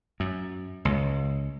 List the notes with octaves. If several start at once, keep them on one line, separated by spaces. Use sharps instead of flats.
F#2
C#2